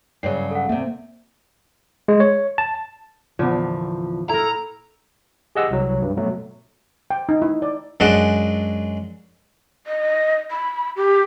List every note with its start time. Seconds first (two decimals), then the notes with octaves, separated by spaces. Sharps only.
0.23 G2 C#3 F#3 C7
0.51 A4 F5 F#5
0.69 D2 C3 A#3 E5
2.08 G#3
2.20 C#5
2.58 A5
3.39 E2 A#2 D3 F3
4.29 E4 A4 A#4 A#5
5.55 G4 G#4 D#5 F#5 E6
5.70 C2 F#3
6.02 G2
6.17 B2 F#3 A3
7.10 G5
7.29 D#4
7.42 E4
7.62 D5
8.00 F#2 G#3 D4 F#5 A5 D#6
9.87 D#5
10.51 B5
10.96 G4